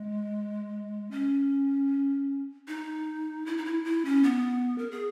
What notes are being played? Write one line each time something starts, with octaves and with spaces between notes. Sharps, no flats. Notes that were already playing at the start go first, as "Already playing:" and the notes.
Already playing: G#3
C#4
D#4
E4
D#4
E4
E4
C#4
B3
A#4
G#4